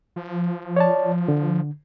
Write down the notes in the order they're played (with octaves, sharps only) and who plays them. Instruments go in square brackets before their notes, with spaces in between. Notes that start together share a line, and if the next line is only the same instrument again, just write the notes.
[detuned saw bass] F3
[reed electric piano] C#5 D5 A5
D3